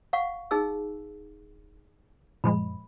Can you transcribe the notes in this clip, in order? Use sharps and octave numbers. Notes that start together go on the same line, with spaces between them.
D1 F5 F#5 C#6
D#4 G#4 E6
F#2 A#2 F3 G#3 B5